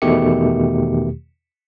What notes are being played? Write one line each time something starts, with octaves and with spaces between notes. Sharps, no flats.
E2 B2 D#3 A3 G4 C#7